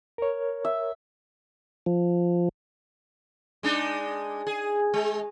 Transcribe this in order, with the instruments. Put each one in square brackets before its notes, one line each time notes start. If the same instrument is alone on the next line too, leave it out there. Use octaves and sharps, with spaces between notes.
[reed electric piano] A#4 C#5
[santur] E5
[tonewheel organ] F3
[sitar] G#3 D4 D#4
G#4
G#3